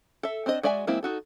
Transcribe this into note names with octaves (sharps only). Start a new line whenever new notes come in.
A4 E5
C4 D4 C5 D#5
G#3 F#4 D5 E5 G#5
E3 G#3 A#3 C4 E4
D#4 F#4 A4